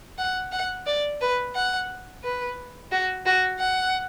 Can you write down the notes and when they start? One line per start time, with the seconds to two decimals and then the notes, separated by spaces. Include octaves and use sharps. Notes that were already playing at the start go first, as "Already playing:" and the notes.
0.18 F#5
0.52 F#5
0.86 D5
1.21 B4
1.55 F#5
2.23 B4
2.92 F#4
3.26 F#4
3.59 F#5